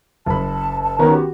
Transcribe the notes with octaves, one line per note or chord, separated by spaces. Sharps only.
F#1 A5 B5
A5
D#3 B3 C#4 A#5
F#4 G4